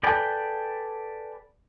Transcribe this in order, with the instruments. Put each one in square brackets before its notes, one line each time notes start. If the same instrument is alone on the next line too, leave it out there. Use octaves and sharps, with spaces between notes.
[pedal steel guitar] G#4 A4 B4 D5 G5